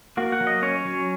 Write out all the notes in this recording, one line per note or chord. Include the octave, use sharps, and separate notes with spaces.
A#3 F#4
F#5
F#3
D#5
C#4 C#5
F#3